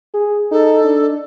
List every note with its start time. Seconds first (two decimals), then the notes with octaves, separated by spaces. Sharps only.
0.14 G#4
0.52 D#4 A4
0.84 D4